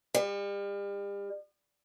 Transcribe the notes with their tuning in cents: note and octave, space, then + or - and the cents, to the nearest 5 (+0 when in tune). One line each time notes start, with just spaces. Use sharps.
G3 +40